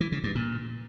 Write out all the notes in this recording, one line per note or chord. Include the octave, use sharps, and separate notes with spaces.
E3
C#3
G2
A#2